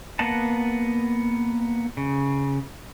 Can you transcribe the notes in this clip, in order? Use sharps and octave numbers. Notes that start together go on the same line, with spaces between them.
A#3 B3 D#5 F#5 A5
C#3